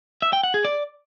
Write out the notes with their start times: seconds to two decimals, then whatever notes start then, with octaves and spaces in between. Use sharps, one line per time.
0.22 E5
0.33 G5
0.43 F#5
0.54 G#4
0.65 D5